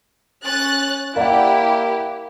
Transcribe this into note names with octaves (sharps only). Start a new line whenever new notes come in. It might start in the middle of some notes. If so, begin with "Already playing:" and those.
C#4 F#6 A6
A#3 E4 G4 D5 F#5